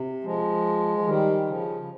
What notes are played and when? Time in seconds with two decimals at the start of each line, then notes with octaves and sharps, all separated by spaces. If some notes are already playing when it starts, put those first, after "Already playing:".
Already playing: C3
0.24 F3 G#3
0.98 F3
1.06 D#3 G3
1.47 C#3 F3
1.82 C#3